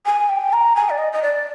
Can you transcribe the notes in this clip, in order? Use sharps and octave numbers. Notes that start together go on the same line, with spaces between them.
G#5
G5
A#5
G#5
D5
D#5
D#5
D5